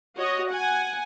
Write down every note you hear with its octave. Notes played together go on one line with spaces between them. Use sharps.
F#4 C#5 D#5
F#5 G#5